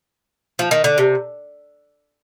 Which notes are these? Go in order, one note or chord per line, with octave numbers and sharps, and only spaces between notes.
F3
D#3
D3
C3